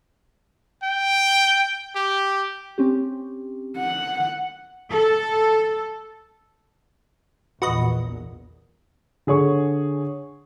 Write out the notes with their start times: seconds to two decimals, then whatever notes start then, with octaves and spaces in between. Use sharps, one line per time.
0.83 G5
1.96 G4
2.78 C4 C#4 G4
3.78 F#5
4.90 A4
7.62 A#1 E2 A#2 F#4 B4 D#5
9.27 D3 G#4 C#5 C#6